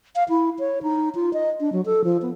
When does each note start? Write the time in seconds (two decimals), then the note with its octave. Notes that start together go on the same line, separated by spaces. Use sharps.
0.16 F5
0.29 E4
0.59 C#5
0.83 D#4
1.15 F4
1.33 D#5
1.60 D4
1.72 F#3
1.86 A4
2.04 F3
2.22 B3